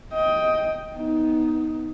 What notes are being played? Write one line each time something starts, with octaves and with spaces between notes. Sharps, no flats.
D#5 G5
B3 D#4